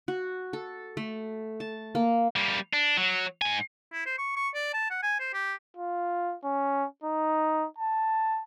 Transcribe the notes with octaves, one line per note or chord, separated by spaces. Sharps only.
F#4
A4
A3
A5
A#3
G3 A#3
D4
F#3
G#2 G#5
E4
C5
C#6
C#6
D5
A5
F#5
G#5
C5
G4
F4
C#4
D#4
A5